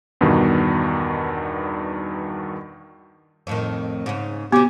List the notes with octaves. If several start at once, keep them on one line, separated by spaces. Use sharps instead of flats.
E2 G2 B2 D#3
F2 A2 D#3
G#2 C#3
C3 B3 F#4 G4